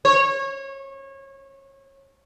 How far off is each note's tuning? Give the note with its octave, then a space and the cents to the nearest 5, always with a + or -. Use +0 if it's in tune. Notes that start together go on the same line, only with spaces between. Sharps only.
C#5 -25